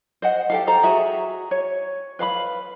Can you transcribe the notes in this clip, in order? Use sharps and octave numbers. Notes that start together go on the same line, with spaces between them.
C5 D#5 F#5
G4 A4 F5
A4 C5 A#5
F#4 G#4 E5
C#5
B4 F5 A#5 B5